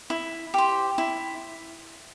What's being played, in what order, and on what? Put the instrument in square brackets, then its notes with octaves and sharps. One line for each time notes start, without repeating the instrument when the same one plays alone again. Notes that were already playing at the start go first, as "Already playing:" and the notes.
[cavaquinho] E4
G4 C5
E4